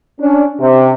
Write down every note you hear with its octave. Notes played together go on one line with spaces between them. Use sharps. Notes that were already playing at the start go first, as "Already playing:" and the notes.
C#4 D4
C3